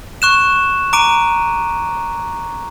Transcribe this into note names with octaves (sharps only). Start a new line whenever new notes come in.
C#6 F#6 E7
A#5 D6 D7 D#7